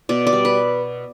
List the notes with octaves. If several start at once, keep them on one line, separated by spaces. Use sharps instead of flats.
B2 D5
D5
G3
B4